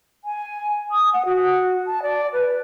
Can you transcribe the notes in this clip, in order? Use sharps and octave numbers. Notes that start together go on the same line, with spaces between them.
G#5
D#6
F#5
F#4
A5
D5
B4